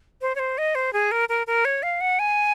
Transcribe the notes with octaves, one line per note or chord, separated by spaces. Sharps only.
C5
C#5
C5
D#5
C5
G#4
A#4
A#4
A#4
C#5
F5
F#5
G#5